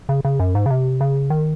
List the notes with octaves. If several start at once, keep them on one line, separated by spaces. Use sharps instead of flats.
C#3
C#3
F#2
G#2
C#3
C3
C#3
D#3